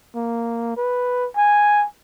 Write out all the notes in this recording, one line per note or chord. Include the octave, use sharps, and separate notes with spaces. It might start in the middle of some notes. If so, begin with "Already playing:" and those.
A#3
B4
G#5